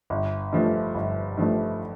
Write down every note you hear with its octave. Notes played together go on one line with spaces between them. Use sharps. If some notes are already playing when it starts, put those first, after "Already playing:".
G1
G2 F3 A3
G1
G2 F3 A3